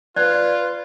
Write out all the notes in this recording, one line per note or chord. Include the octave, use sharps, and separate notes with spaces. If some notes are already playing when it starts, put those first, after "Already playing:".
F4 B4 D5 F#6